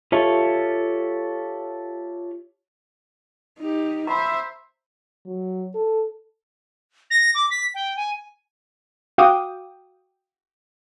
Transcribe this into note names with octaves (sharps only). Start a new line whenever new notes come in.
F4 G4 A4 C#5 E5
D#4 G4
C5 E5 A#5 B5
F#3
A4
A#6
D6
B6
G5
G#5
F#4 F5 G5 D6 D#6